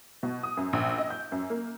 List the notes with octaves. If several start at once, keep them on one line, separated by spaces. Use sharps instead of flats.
B2
D#6
F#2
A#1
D#5
G6
F#2
A#3